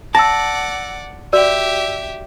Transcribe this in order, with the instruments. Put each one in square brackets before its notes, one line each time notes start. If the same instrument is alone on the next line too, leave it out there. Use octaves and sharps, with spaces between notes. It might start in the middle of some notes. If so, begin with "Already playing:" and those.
[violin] D5 F#5 [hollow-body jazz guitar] A5 [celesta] E6 A#6
[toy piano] F#4 D5 [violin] G4 E5 [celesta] E6